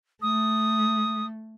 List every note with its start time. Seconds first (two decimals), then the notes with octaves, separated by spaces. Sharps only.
0.22 A3 D#6